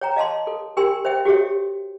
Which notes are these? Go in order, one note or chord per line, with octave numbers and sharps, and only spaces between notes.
C#5 G5 A#5
D#5 F5 A5 C6
A4
G4 A#4 G5 G#5 C6
C5 E5 G5
F#4 G4 A4 C#5 E5